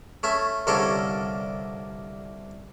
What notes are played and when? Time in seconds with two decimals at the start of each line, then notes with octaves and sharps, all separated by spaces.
0.23 A3 C#4 E5
0.67 C2 D3 A#3 C#4 A4 A#4